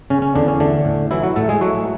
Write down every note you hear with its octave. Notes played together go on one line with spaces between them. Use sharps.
C#3 C#4
C#4
E2 D3 D4
C#4
D3 A3 D4
A2
E3 F#3 E4
F#3 F#4
A2 A3 A4
G#3 G#4
F#3 A3 F#4